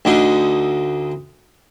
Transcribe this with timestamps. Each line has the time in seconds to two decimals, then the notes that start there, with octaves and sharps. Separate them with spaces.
0.05 D2 D3 D#4